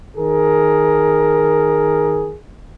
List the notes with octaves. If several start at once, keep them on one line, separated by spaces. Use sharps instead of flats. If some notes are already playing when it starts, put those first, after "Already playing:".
D#3 G#4 A#4